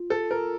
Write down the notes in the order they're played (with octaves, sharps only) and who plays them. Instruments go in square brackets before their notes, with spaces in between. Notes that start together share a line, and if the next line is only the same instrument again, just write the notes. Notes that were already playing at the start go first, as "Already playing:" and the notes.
Already playing: [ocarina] F4
[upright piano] A4
A#4